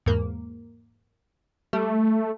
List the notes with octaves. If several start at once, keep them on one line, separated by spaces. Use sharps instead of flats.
E2 G#2 A#3
G3 A3